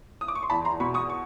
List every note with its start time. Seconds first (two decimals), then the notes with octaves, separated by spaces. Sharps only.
0.21 D#6
0.28 D6
0.35 C#6
0.43 C6
0.50 E2 A5 B5
0.65 A#5 C6
0.80 B2 B5 C#6
0.94 C#6 D#6
1.10 C#6